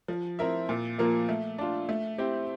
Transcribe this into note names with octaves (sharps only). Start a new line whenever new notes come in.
F3
C4 E4 A#4 E5
A#2
F3 A#3 F4 A#4
A3
D4 F4
A3
C4 E4 G4